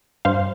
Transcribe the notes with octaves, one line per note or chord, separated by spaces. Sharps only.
G2 C5 F5